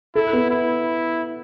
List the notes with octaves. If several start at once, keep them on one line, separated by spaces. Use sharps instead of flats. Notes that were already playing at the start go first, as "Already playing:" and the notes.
E4 A4
B3
E4